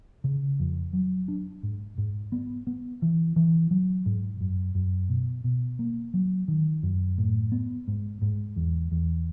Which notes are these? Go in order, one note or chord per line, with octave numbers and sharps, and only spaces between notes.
C#3
F2
F#3
D4
G#2
G#2
B3
B3
E3
E3
F#3
G#2
F#2
F#2
B2
B2
A#3
F#3
D#3
F#2
A2
B3
G#2
G#2
E2
E2